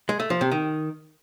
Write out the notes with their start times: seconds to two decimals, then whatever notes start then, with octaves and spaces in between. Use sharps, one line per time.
0.09 G#3
0.20 A3
0.30 F3
0.41 C3
0.52 D#3